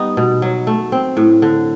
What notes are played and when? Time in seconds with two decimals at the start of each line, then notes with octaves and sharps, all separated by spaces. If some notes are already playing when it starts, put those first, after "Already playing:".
Already playing: G3 B3 D#4
0.17 B2
0.42 F#3
0.67 A3
0.92 C4
1.17 A2
1.42 D3